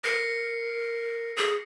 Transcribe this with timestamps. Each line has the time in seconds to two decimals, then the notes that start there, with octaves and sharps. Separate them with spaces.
0.04 A#4 A#6 C7 C#7
1.37 G#4